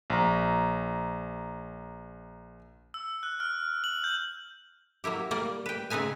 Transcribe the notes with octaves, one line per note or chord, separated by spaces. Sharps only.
A#1 A#5
E6
F#6
F6
F#7
G6
F#3 A#3 E4 G4
G3 A#3 D5
B4 G5
C#3 C4 D#4 B4 G#5